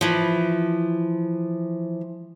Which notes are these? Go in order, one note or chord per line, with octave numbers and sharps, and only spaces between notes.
E3 F3